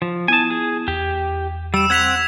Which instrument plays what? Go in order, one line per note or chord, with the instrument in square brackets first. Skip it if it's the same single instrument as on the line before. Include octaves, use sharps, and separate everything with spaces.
[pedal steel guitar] F3
[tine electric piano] B3 E4 D#6 [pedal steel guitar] G#5 A5
[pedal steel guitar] G#4
[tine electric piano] E2 [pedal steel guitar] G4
[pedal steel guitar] G3 [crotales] E6 E7
[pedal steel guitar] C4 F#5 [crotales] G#6 B6 F7